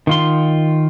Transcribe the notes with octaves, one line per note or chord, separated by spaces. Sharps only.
D#3 F4 C6